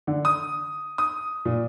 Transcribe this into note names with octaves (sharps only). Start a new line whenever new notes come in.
D3
D#6
D#6
A#2